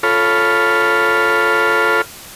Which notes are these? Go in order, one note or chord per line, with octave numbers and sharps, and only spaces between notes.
F4 A4 C#5 B5 F6